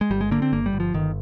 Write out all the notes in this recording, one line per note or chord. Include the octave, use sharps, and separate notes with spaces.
G#3
G1 G3
G#3
D3 A#3
C4
G1 A#3
G3
G1
F3
G1 D#3